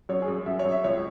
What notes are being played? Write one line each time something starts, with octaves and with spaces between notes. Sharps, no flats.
F#2 C#5
G#4
F#2
F#2 E5
C#5
F#2
E5
C#2 C#5